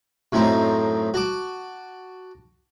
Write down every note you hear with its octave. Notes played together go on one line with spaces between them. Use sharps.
F#2 A2 A3 C4 D#4
F#4 A5 D6